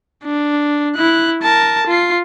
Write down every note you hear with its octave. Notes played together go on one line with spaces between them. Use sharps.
D4
E4 F#6
A#4 A5
F4 C7